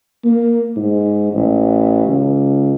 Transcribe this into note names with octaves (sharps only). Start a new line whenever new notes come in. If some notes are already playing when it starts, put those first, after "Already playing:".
A#3
G#2
A1
C#2